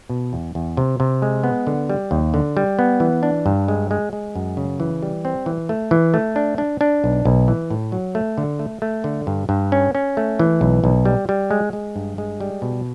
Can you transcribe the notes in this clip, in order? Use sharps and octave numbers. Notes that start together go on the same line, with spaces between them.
B2
E2
E2
C3
C3
G#3
B3
D3
G3
D#2
D3
G3
B3
E3
D4
G2
G#3
G#3
G#3
F#2
C#3
E3
G3
C4
E3
A3
E3
A3
D4
D4
D4
B1
B1
E3
A2
F#3
A3
D3
A3
A3
D3
G2
G2
C#4
C#4
A3
E3
B1
B1
G3
G3
G#3
G#3
G2
G#3
G3
B2